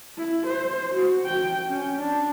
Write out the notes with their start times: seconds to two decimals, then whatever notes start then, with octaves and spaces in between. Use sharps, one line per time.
0.18 E4
0.47 C5
0.94 F#4
1.26 G5
1.69 C#4
2.00 D4